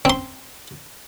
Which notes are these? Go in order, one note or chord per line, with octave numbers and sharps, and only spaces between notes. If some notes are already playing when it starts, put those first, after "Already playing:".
C4 C6